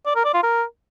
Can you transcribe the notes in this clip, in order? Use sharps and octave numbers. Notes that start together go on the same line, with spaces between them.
D5
A#4
D5
F4
A#4